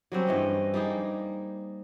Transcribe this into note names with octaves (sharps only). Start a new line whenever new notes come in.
F#3 G3 C4 C#4
G2 E3 D#5
G3 A#3 D#4 G#4